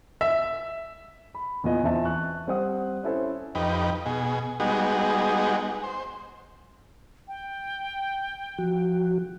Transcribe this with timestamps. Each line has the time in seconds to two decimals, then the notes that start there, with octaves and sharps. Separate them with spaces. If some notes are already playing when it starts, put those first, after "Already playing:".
0.21 E5
1.35 B5
1.64 E2 A#2 B3 F4 D#5 G#5
1.84 E2 C4 E5 A5
2.05 C#6 F#6
2.47 G3 C4 C5 F#5 D#6
3.03 C#4 E4 A4 C5
3.55 F2 D#4 G4 B4
4.06 B2 G#4
4.60 G3 G#3 B3 D#4 F#4 G#4
5.84 C5
7.28 G5
8.59 F3 F#4